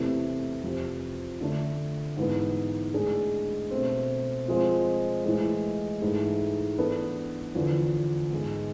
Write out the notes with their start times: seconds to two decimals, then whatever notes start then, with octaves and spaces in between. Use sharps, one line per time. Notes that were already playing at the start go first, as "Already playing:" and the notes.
Already playing: E2 C3 E3 A3 E4
0.63 F2 C3 F3
1.41 D3 A3 D4
2.17 G#2 E3 B3
2.93 A2 G#3 D4 G#4
3.71 B2 A3 C4
4.48 F3 G#3 C4 F4
5.25 A2 E3 G#3
6.01 G#2 E3 A3 E4 G#4
6.78 E3 B3 D4 A4
7.55 E2 D3 F3
8.31 G#2 G#3 B3